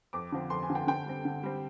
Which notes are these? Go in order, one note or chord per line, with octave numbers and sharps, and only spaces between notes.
F2 D6
D3 F3 C4
F2 C6
G#5
D3 F3 C4
G5
D3 G5
G3 C4
D3
G3 C4